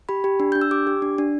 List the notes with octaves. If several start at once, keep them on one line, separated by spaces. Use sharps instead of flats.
G4 B5
G4
D4
D4 G6
E6
G4 D6
G4
D4
D4